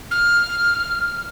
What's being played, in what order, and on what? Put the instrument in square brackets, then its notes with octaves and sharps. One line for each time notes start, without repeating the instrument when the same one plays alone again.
[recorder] F6